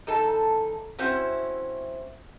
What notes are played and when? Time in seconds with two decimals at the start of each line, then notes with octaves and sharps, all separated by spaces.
0.07 E2 D#4 A4 A5
0.99 C4 C#4 E4 F#4 C5